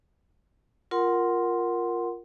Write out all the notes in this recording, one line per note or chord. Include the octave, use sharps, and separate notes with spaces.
F4 A#4 F#5 C6